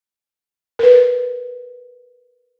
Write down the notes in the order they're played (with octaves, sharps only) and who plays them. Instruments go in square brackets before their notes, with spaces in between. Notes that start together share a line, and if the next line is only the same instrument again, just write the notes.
[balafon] A#4 B4